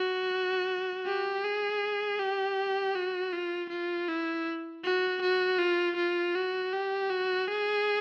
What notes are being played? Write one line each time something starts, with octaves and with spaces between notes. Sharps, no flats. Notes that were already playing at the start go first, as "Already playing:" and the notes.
Already playing: F#4
G4
G#4
G4
F#4
F4
F4
E4
F#4
F#4
F4
F4
F#4
G4
F#4
G#4